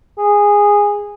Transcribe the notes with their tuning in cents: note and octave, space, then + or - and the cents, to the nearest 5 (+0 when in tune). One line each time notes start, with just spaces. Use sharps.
G#4 -15